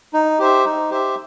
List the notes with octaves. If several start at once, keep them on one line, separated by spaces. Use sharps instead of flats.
D#4
G4 C5 E5
D#4
G4 C5 E5